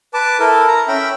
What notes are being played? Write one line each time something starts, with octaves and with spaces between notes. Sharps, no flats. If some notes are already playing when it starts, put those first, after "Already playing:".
B4 A5 D6
E4 A4 A#4
A#5
C#4 E5 G5 B5